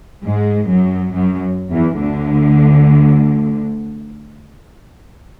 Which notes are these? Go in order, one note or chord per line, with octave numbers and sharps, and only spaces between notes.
G#2 G#3
F#2 F#3
F#2 F#3
E2 E3
D2 D3